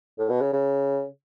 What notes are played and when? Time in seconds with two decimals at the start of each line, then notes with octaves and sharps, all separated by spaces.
0.19 A2
0.30 B2
0.41 C#3
0.53 C#3